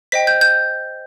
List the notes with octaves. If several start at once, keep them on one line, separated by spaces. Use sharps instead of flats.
C5 D#5 G5 B6
G6
G6